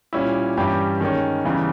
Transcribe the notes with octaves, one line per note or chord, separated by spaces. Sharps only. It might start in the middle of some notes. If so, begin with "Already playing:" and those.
A#2 G3 C#4 E4
G2 E3 G3 C#4 G4
D#3 G#3 C#4
E2 C#3 E3 G3